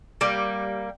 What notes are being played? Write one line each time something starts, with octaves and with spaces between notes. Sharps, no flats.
G3 A#3